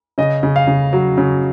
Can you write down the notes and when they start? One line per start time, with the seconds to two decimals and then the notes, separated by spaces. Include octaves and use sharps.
0.18 C#3 D#5
0.43 C#3
0.56 F5
0.67 C#3
0.93 F#3
1.18 C#3